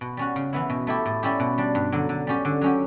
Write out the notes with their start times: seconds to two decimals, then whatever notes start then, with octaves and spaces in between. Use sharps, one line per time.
0.01 B2
0.17 G3 C#4 F#4
0.36 C#3
0.53 E3 B3 E4
0.70 B2
0.87 A3 E4 G4
1.06 A2
1.23 G3 C#4 E4 G4
1.40 B2
1.58 G3 D4
1.75 G2
1.92 D3 F#3
2.09 D3
2.27 G3 C#4 G4
2.45 D3
2.61 F#3 C#4 G4